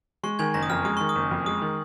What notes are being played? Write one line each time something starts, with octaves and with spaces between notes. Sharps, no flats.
G#3 C#6
D#3 G#5 G#6
F#1 A#5 A#6
D#6
F2 F6
G#3 D#6
D#3 C#6
D#6
F#1
F2
G#3 D#6
D#3